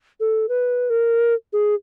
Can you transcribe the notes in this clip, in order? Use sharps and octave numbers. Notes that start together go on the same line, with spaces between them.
A4
B4
A#4
G#4